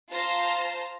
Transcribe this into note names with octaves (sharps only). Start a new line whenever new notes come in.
F4 C5 F5 A5 A#5